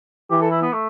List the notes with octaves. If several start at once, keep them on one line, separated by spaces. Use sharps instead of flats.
E3 G4
A4
E4
B3
A3